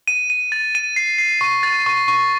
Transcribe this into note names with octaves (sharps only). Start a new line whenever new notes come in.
D#7
D#7
A6
D#7
C7
C7
C#6
A6
C#6
C#6